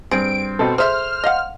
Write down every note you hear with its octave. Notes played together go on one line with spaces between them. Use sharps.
G2 C4 G#4 D7
B2 C4 A4
G#4 A4 C5 E5 F6
D#5 F5 F#5